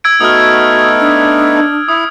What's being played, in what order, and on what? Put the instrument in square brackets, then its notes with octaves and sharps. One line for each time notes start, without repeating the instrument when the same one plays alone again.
[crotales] E6 G#6 D7
[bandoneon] A3 B3 D#4 [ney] F#4 [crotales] D#6 F6
[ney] D4
[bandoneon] E4 [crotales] D#6